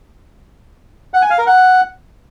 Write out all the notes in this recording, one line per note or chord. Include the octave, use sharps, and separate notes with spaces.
F#5
G#5
F5
A#4
F#5